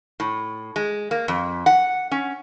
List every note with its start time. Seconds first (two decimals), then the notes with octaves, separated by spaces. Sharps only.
0.20 A2
0.76 G#3
1.11 A#3
1.28 F2
1.66 F#5
2.11 C#4